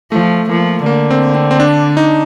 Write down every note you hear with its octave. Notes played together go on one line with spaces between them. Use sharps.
F3 A3
F3 A#3
D3 A#3
C4
C4
C4
D4
D#4